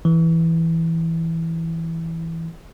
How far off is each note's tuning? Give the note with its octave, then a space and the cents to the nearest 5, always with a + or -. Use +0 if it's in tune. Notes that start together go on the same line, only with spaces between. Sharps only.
E3 -5